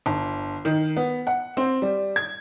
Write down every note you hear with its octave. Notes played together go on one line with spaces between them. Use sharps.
G1
D#3
B3
F#5
C4
G3
G#6